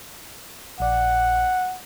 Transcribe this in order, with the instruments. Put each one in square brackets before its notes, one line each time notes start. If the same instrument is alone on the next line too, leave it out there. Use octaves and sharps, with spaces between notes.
[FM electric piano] A#1 D5 [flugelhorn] F#5